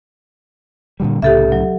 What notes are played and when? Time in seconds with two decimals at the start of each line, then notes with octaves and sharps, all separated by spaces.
1.00 A#2 D3 G3
1.22 C2 A2 C#3 G4 A4 E5
1.52 F#3